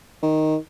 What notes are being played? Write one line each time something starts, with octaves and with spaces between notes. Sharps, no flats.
D#3